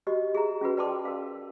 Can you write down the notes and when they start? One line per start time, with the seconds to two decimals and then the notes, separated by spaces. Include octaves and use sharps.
0.07 F#4 G4 D#5
0.35 G#4 E5 A#5
0.61 C#4 F4 F#4 B4
0.77 B4 D5 G5 A5 C6 D6
1.05 A#4 F5